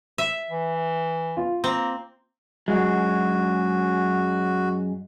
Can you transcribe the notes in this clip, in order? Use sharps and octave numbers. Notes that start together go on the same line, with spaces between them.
E5
E3
F4
A#3 C4
F#2 G#3 F#4